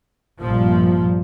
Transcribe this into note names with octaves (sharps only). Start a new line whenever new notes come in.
A#1 G2 A#2 F3